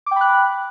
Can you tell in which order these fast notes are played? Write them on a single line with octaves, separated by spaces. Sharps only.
D6 G5 B5 F#6